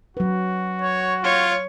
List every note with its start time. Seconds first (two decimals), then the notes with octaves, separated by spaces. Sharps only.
0.17 F#3 F#4 B4
0.81 C#5
1.24 F4 C#5